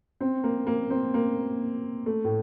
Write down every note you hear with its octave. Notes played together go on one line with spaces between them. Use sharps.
C4
A#3
A#3
C4
A#3
A3
A2